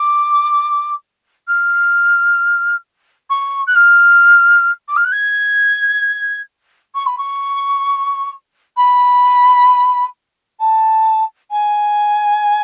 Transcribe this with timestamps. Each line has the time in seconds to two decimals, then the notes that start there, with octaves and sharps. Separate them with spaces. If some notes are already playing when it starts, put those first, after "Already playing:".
Already playing: D6
1.48 F6
3.30 C#6
3.67 F#6
3.75 F6
4.88 D6
4.96 F6
5.05 F#6
5.12 G#6
6.95 C#6
7.06 B5
7.18 C#6
8.77 B5
10.60 A5
11.51 G#5